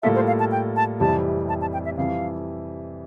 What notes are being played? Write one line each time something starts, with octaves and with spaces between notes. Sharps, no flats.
A2 G3 A#3 F4 A4 E5
C5
F5
A5
G5
A5
F1 F2 C3 E3 G3 A5
A5
A5
G5
E5
F2 E3 G3 F5